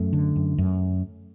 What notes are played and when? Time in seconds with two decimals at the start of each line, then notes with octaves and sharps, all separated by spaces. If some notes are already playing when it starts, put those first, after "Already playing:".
Already playing: F#2 A3
0.13 D3
0.36 F#2
0.58 F#2